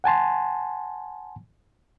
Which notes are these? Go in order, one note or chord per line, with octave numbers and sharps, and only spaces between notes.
F#5 G#5 A5 C6